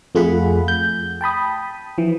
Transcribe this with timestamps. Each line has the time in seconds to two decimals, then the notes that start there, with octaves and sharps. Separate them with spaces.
0.15 F2 A3 F4 G#4 F#5 B5
0.68 G6
1.21 G5 A5 B5 D#6
1.98 E3 F3